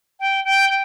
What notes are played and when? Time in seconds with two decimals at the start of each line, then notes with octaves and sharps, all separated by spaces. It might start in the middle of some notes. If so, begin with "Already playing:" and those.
0.20 G5
0.44 G5
0.69 G5